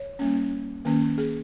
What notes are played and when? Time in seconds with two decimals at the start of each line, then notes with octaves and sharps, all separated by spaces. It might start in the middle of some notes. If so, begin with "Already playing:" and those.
Already playing: C#5
0.19 G3 A#3 C#4
0.85 D#3 A#3 C#4
1.18 G#4